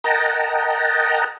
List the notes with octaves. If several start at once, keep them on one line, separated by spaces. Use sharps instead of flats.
A#4 D#5 F#5 G5 A5 A#5